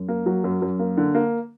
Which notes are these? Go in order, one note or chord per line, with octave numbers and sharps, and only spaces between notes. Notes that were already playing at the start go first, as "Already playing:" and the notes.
Already playing: F#2
A#3
F#3
F#2
F#2
A#3
D3
A#3